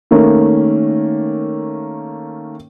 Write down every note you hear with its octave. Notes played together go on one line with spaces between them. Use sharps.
D#3 A3 A#3 C#4